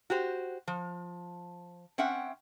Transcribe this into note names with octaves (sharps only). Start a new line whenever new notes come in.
F#4 G4 C5
F3
C4 C#4 E5 F#5 G5